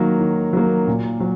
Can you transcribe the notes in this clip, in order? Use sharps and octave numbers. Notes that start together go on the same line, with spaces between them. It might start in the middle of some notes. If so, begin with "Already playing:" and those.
Already playing: D#3 F#3 A#3
D#3
F#3 A#3
A#2
F#3